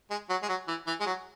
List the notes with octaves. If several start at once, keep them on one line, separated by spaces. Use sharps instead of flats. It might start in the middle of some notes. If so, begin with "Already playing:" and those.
G#3
F#3
G#3
F#3
E3
E3
G#3
F#3